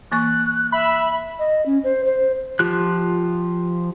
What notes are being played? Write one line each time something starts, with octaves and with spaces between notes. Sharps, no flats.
E3 A#3 C#6 F#6
E5 B5
D#5
C#4
C5
C5
F3 F4 G4 F#6